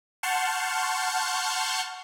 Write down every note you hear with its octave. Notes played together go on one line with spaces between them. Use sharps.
F#5 A5 C6 C#6 F6 G6